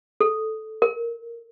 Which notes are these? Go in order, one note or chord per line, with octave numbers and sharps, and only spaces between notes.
A4
A#4